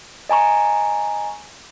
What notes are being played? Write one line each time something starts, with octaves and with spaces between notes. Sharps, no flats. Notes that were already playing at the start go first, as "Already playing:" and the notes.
D#5 G#5 A#5 C#6